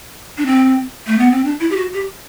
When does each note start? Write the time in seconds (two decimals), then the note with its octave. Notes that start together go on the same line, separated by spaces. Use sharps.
0.38 D4
0.46 C4
1.07 A3
1.19 B3
1.31 C4
1.45 D4
1.60 E4
1.70 G4
1.77 F#4
1.94 G4